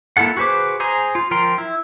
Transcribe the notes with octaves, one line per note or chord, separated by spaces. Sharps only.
A#3 E4 F4 A4 F#5
F#4 G#4 B4 C5 D6
G#4 C5 G#5 A#5
F4
F3 A#4 G5 A#5 C6
E4